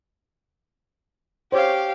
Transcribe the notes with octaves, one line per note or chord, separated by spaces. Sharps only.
G4 C5 C#5 F5 D6